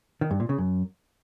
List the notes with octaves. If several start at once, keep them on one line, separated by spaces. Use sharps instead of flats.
D#3
G2
A#2
C#3
F#2